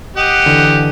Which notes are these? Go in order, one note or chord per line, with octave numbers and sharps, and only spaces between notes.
G4 D#5 F#5
D3 E3